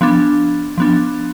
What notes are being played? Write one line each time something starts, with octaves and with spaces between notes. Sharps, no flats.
F3 B3 D4
F3 B3 D4